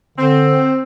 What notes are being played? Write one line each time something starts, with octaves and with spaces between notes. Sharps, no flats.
D3 C4